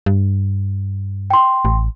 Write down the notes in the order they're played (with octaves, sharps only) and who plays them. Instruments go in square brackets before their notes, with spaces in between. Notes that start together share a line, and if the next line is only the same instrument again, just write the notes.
[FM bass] G2
[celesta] G5 C6
[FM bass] A1